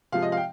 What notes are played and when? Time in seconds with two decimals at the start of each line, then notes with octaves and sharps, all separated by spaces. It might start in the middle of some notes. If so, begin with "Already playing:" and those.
0.12 C3 F3 G#3 F5
0.22 D#5
0.32 F5
0.37 G5